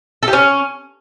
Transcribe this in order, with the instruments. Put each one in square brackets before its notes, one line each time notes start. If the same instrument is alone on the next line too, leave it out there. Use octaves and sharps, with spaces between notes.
[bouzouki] A4
G4
C#4